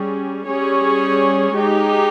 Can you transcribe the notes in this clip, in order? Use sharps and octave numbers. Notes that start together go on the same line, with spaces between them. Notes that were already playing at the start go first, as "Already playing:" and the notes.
Already playing: G3 C#4 G#4
G3 C#4 G#4 C#5
G#3 D#4 G4